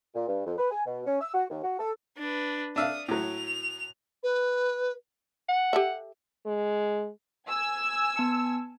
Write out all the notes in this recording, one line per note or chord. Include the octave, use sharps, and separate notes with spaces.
A#2
G2
F2
B4
G#5
B2
C#4
E6
F#4
D#2
F#4
A4
D4 B4
D4 E5 F5 D#6
A2 F#3 F7
B4
F#5
G4 A4 E5
G#3
G#5 E6
B3 A5 C#7